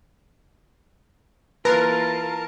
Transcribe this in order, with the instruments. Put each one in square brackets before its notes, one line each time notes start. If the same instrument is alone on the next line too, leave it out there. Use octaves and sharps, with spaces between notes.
[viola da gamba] E3 A#3 F4 [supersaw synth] A#4 [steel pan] B4 [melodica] A5